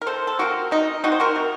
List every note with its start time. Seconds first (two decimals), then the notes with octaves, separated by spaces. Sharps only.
0.02 A#4
0.06 C3 A4 C5
0.27 A4
0.39 F3 C4 F#4 A#4
0.71 C3 D#4
1.03 F3 C4 D#4 F#4
1.12 C5
1.20 F#4 A#4
1.36 C3